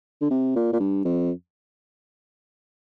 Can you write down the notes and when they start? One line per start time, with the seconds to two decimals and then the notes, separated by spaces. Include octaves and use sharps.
0.21 D3
0.31 C3
0.56 A#2
0.73 A#2
0.80 G2
1.05 F2